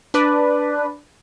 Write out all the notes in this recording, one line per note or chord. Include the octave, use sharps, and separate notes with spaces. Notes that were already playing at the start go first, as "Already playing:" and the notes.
D4 B4 D5